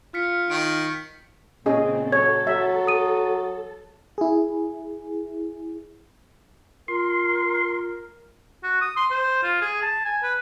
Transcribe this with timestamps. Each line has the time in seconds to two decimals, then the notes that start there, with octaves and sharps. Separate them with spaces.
0.14 F4 F6 B6 C#7
0.50 D#3 D7
1.66 A#2 C#3 C4 C#4 G#4 D#5
2.12 F#3 A4 C#5 G#6
2.47 F#3 E5
2.87 D#6 D#7
4.18 E4 G#4
6.88 F4 A#4 C6
8.63 F#4
8.81 D#6
8.96 C6
9.11 C5
9.43 F4
9.61 G#4
9.82 A5
10.05 G#5
10.23 B4